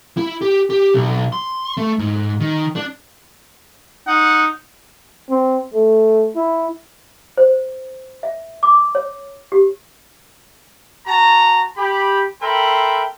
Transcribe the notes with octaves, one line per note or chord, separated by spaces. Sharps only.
E4
G4
G4
B1
C6
A3
G#2
D#3
D4
D#4 F#5
C4
A3
E4
C5
E5
D6
C#5
G4
F#4 A5 A#5
G4 B5
A4 A#4 E5 G5 B5 C6